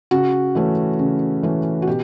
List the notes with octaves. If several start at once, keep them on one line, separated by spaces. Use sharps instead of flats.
C#3 F#4
E3 A3 C#4
C#3
E3 A3 C#4
F#4
B2 G4